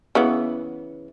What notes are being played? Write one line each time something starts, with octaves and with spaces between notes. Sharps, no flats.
C#3 E3 B3